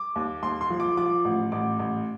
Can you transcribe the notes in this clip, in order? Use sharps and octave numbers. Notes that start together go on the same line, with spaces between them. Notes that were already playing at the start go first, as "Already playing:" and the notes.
Already playing: D6
D#2
D#2 C6
C6
F3
D6
F3 D6
A1
A1 D6
A1